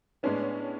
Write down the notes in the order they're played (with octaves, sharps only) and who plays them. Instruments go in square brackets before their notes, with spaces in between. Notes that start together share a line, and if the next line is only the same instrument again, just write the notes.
[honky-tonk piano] A2 G#3 C#4 [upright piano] B3 D4